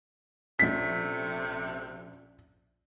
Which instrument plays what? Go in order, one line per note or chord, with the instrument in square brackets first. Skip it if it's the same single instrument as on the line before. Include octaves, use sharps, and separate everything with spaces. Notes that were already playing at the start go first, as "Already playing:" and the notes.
[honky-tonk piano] A#1 C#4 [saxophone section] C3 A3 [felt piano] B6